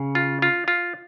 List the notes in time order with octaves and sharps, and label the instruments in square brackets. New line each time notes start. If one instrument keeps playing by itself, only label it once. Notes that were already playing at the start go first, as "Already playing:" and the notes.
Already playing: [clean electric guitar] C#3
[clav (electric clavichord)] F4
F4
F4